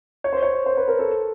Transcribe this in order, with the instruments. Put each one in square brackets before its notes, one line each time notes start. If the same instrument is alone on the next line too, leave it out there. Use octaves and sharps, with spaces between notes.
[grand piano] C#5
C5
C#5
C5
B4
A#4
A4